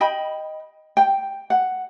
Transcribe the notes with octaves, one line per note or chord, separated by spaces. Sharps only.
D#5 G5 B5
G5
F#5